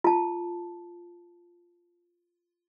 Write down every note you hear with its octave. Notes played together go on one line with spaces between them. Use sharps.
F4 A5